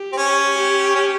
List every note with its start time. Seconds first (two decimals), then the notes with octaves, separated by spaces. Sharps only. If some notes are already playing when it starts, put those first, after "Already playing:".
Already playing: G4
0.12 C4
0.17 C#4
0.57 G4
0.95 C#4